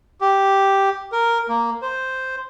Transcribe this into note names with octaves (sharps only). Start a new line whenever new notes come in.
G4
A#4
A#3
C5